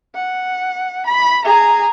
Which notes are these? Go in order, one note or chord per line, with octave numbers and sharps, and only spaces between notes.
F#5
B5
G#4 A#5